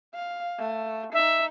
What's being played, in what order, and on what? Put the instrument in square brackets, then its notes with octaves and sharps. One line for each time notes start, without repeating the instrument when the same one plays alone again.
[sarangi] F5
A3
[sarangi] D#4 [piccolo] E5